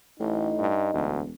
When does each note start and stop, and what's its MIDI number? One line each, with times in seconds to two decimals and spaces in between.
0.20 0.50 33
0.20 0.69 45
0.20 1.13 63
0.59 0.90 43
0.94 1.31 28
0.94 1.21 38